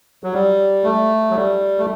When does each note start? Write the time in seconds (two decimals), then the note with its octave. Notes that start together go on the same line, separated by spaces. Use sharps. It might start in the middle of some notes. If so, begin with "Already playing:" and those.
0.24 F#3
0.33 G3
0.84 A3
1.31 F#3
1.35 G3
1.78 A3